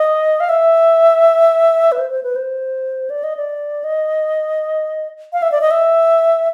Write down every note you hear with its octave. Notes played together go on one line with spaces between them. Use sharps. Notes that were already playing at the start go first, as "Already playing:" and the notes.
Already playing: D#5
F5
E5
B4
C5
C5
B4
C5
D5
D#5
D5
D#5
F5
E5
D5
D#5
E5